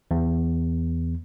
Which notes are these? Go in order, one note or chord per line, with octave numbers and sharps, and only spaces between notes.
E2